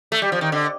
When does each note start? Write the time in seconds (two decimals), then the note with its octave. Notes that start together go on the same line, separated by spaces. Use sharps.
0.12 A3
0.22 G3
0.32 F3
0.41 D#3
0.52 D3